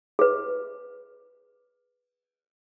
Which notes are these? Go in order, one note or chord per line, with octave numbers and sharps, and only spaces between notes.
G#4 B4